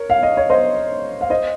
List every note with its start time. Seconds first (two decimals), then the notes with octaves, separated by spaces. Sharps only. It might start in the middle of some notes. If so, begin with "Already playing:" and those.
Already playing: A#4 C#5
0.10 F5
0.23 D#5
0.37 C#5
0.50 C5 D#5
1.21 F5
1.30 C5 D#5